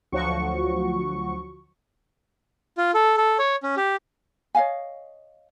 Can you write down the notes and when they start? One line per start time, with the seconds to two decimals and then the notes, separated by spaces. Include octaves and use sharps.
0.12 D2 F3 F#3 F#4 C#6
2.78 F4
2.94 A4
3.17 A4
3.39 C#5
3.63 C#4
3.77 G4
4.55 C#5 D#5 F5 G#5